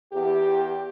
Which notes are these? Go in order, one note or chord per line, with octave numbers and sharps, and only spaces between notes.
E2 G4